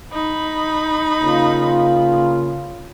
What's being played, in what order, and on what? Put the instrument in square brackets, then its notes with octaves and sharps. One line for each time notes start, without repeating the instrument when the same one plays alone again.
[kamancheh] D#4 B5
[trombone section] C#3 A#3 F4